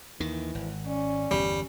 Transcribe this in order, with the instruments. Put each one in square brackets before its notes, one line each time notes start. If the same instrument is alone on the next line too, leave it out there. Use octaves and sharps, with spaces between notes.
[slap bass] D#2 D#3 [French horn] E3
[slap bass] G#1
[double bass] C#4 [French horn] D5
[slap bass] G1 E2 [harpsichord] G3